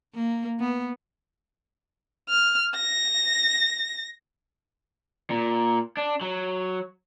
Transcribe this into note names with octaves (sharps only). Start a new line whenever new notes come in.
A#3
B3
F6
A#6
A#2
D4
F#3